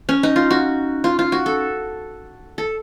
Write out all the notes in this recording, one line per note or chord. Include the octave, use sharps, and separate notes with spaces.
C#4
D#4
F4
F#4
F4
F4
F#4
A4
A4